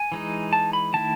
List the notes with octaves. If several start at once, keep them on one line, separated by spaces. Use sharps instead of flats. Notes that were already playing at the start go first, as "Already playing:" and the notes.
Already playing: G#5
E3 G#3 D#4
A5
B5
D#3 A3 E4 A5